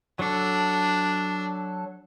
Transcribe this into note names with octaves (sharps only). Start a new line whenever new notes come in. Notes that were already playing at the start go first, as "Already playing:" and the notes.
F#3 D4 A4